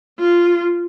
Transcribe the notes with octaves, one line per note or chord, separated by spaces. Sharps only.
F4